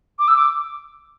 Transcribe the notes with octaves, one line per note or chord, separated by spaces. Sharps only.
D6
E6
D6